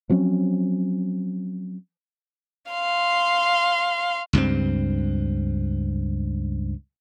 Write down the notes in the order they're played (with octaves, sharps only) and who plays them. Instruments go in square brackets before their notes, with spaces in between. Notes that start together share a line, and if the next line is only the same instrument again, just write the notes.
[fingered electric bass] F3 F#3 C4 C#4
[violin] F5 C6
[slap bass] C#2 G2 G#3 C4